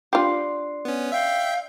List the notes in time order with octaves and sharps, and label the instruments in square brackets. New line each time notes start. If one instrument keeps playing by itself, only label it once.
[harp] D4 C6 [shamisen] F4 G4
[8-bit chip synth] B3 C#4
[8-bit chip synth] E5 G5 G6 [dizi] F5